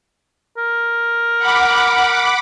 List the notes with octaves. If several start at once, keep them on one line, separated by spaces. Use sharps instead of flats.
A#4
F#5 B5 D6